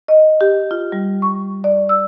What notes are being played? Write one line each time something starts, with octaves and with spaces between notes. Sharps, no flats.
D#5
G4
F4
G3
C#6
D5
E6